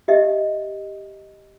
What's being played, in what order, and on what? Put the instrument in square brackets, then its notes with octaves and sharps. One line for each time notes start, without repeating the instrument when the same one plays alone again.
[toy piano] G4 D#5 E5